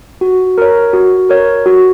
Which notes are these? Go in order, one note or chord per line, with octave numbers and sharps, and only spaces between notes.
F#4
A#4 C#5
F#4
A#4 C#5
F#4